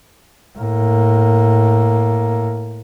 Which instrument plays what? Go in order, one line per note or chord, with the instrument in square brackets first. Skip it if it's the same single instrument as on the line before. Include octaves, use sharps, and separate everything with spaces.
[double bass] A2 A#3